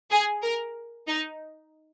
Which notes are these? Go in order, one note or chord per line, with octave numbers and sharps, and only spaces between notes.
G#4
A#4
D#4